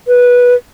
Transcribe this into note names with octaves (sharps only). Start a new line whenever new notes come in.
B4